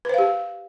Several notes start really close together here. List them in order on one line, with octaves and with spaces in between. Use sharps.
B4 C5 F5 G4